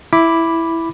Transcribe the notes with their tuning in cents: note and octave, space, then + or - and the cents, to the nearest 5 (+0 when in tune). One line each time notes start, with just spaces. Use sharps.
E4 +0 B5 +0 D6 +0